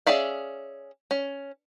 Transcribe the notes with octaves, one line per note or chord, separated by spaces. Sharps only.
C#4 G#4 D5 E5 F5
C#4